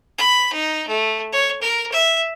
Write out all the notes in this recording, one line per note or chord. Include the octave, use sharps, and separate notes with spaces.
B5
D#4
A3
C#5
A#4
E5